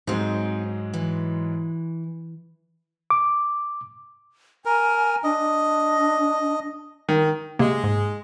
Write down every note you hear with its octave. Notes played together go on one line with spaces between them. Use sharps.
G#2 F#3 G#3 C4 D#4
E3
D6
A#4 G#5
D4 D#5
D#3
C3 G#3 A#3
G#2